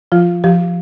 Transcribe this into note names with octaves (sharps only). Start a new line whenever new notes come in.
F3 F4
F3 G4